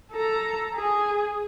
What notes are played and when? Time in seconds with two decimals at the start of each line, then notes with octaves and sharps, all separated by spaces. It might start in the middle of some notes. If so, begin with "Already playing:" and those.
0.12 A4 A#5
0.75 G#4